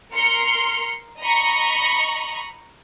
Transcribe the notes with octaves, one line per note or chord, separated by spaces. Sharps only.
A#4 C6 F6 C#7
D#5 A#5 B5 C#6